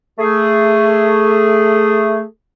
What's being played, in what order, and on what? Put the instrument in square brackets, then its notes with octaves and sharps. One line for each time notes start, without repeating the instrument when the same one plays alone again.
[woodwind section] A3 G#4